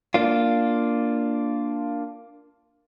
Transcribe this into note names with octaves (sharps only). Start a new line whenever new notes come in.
A#3 D4 F4